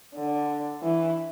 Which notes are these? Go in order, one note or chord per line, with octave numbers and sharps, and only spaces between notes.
D3
E3